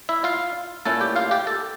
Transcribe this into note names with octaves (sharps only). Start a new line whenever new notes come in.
E4 E5
F4 F5
A#2 A3 C#4 E4 A4 A5
G4 G5
F4 F5
G4 G5
A4 A5